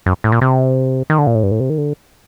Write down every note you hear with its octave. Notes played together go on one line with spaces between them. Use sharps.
F#2
A2
A#2
C3
D#3
D3
A#2
A2
G2
A2
C3
D#3
D3